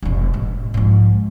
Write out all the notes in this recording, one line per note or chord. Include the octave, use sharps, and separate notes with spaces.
F1 C3
A1
G#2 F3